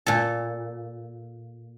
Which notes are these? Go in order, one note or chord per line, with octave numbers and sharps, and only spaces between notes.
A#2 A4